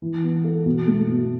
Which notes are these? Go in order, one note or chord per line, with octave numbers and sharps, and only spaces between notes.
E3
B3
A4
B2
A3
B2